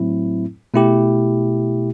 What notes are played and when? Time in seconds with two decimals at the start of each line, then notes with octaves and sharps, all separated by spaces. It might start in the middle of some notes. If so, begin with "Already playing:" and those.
Already playing: A2 F#3 A3 C4 E4
0.74 B2 A3 E4 G4